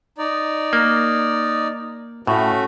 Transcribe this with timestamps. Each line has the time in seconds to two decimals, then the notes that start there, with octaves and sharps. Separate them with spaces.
0.18 D#4 D5
0.73 A#3
2.27 A2 A3 C#4 F#4